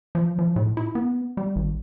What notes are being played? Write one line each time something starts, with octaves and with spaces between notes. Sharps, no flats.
F3
F3
A2
E4
B3
G3
G#1